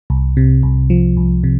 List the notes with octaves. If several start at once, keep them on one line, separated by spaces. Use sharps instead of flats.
C2
C3
C2
F3
C2
C3